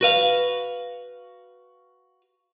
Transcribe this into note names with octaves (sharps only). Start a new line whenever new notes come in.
F#4 B4 F5